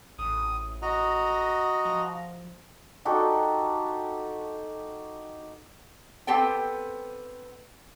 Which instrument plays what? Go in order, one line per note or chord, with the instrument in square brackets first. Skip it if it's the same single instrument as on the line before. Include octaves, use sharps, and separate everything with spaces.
[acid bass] A1 [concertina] D#6
[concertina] F#4 D#5 A#5
[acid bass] F3
[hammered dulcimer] D#4 F#4 G4 A4
[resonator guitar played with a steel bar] B3 C4 G4 A4 G5